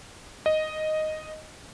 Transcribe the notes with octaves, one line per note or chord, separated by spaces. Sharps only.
D#5